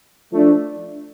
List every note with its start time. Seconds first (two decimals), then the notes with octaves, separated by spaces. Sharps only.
0.31 F3 A3 D4